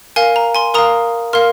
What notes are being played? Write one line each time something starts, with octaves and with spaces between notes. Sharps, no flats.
A#4 F5 G#5
A#5
G#5 C6
A#4 F5 A#5 D#6
A#4 F5 C6 F6